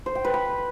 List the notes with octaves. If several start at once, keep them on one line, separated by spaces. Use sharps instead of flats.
C5
G5
B4
B5